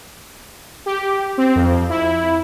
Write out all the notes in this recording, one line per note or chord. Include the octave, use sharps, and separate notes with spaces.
G4
C4
F2
E4